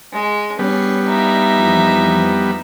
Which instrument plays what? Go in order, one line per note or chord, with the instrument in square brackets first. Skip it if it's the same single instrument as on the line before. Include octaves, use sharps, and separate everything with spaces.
[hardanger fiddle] G#3
[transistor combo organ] G3 B3 [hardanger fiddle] C#4 [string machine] D4 C#6 C7
[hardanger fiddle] D#4 E5 [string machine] D5 F5
[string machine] F2 E3 F3